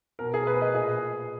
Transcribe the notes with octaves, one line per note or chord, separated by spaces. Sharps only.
B2 A#4
G#4
B4
D#5
A#2 G#4